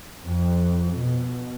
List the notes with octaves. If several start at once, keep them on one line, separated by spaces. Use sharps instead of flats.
F2
B2